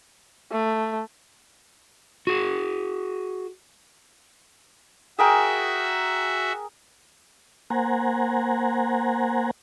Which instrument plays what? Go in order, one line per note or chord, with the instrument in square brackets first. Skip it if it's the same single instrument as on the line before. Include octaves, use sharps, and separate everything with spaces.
[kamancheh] A3
[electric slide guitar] F#4 G#4
[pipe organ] F#4 E5 [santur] G#4 A#4 G5
[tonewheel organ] A#3 C5 F#5 G#5 A#5